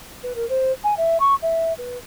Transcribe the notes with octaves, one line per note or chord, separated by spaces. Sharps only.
B4
A#4
C5
G#5
E5
C#6
E5
B4